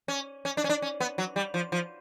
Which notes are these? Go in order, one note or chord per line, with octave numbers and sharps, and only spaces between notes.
C#4
C#4
D4
C#4
D4
C#4
B3
F#3
G3
F3
F3